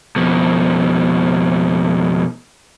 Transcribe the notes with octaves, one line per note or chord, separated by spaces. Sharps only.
F2 B2